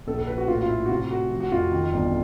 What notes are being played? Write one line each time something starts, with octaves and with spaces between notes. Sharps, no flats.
A#1 A4
A4
F3 B4
F#4
A2 F4
F4
A2 E4
F#4
C3 F4
A3 F#4
F3
F#4
F2 F4
D#3
G1